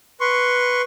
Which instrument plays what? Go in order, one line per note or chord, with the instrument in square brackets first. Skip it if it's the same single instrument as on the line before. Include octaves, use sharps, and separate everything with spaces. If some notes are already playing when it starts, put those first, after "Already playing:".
[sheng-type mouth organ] B4 C6 C#6